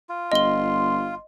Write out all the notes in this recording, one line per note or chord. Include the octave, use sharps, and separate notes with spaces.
F4
G1 D#5 C6 G7